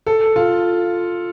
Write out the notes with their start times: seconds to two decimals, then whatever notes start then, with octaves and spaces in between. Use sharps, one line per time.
0.07 A4
0.36 F4